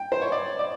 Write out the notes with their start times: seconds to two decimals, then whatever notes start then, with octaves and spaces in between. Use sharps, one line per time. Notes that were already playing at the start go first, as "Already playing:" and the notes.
Already playing: G5
0.12 C5
0.22 C#5
0.32 D5
0.59 D5